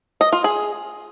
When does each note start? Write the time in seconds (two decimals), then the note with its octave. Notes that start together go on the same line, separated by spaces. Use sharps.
0.21 D#5
0.33 F4
0.44 G#4